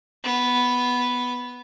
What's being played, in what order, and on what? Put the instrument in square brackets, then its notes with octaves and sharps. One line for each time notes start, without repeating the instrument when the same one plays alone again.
[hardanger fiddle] B3